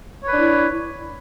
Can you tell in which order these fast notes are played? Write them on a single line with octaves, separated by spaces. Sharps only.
C#5 B4 D4 E4